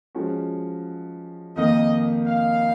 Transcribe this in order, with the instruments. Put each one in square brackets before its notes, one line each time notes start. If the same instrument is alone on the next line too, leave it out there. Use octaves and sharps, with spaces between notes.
[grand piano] F3 G#3 C#4 F#4
[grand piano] F2 D#3 A#3 D#4 [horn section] D#5
[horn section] F5